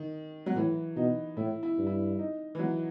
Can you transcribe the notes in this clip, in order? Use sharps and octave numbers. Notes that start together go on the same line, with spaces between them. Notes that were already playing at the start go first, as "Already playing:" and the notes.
Already playing: D#3
F#3
A2 E3
B2 D#4
A2 E4
E4
G2
E4
D#4
E3
F#3